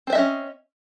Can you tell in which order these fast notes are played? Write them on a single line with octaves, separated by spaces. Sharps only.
C4 C5 E5 D#5 C#4